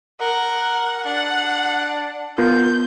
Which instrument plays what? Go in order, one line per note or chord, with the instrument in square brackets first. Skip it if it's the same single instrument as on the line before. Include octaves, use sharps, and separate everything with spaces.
[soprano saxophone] A#4 [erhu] F#5
[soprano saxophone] D4 [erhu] F#5
[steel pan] B3 F4 A#4 [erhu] G6